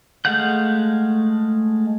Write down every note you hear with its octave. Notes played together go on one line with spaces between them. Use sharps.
G#3 A3 F5 F#5 G6